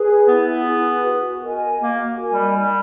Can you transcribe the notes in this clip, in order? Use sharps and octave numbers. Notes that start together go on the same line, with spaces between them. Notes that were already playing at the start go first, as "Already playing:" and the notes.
Already playing: G#4 B4
B3 E4
G#4 B4
F#4
A#4 D#5 G#5
A#3 F#4
A#4 D#5 G#5
G3
G3 D#4